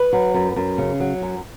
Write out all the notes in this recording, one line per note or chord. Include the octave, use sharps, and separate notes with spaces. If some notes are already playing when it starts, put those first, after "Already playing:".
Already playing: B4
F#3
F#2
F#2
C#3
F#3
F#2